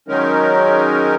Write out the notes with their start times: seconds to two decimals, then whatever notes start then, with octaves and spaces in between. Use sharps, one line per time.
0.08 D#3 F#3 G#3 C#4 D#4 A#4